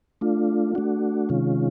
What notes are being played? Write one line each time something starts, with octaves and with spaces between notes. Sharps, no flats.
A3 D4 F4
A3 D4 F#4
C3 D#3 G#3 C#4 F4